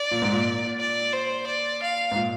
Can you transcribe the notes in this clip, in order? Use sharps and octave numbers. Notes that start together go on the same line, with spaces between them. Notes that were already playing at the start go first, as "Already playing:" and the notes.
Already playing: D5
A#2
G#2
A#2
D5
C5
D5
F5
G#2
A#2